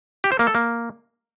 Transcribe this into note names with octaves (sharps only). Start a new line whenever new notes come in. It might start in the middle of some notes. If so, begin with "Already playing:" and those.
G4
C5
A#3
A4
A#3